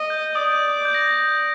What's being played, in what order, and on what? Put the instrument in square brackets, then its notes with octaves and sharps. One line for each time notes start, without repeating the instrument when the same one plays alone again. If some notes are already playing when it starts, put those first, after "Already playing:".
Already playing: [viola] D#5
[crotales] G6
[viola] D5 [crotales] D#6
[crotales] G6
A#6